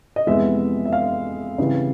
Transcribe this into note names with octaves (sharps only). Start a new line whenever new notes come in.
D#5
F2 C3 E3 G#3 B3 E5
E5
F5
C#3 E3 G3 C4